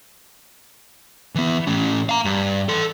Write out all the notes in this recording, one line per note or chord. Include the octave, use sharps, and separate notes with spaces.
E3 B3
A2 C#4
F5 A#5
G2
A4 C6